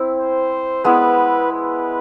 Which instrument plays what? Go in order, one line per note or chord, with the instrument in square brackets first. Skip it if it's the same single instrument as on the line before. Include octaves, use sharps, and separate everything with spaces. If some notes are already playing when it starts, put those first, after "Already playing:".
Already playing: [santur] C4 E4
[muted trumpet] C5
[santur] G#3 B3 E4 [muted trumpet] B4
[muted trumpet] B4